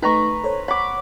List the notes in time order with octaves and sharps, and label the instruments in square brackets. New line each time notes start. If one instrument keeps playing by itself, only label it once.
[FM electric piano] A3 D#4 [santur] B4 A#5 C#6
[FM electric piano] A4 C5 C#5
[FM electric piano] C#5 F#5 [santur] B5 D6